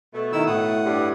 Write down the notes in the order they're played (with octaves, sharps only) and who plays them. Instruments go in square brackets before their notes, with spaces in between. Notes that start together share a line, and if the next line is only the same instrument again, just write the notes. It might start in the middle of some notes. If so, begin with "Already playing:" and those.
[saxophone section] B2 A3
[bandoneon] D#3 E4 E6
A2 F#5 D#6
[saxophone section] G2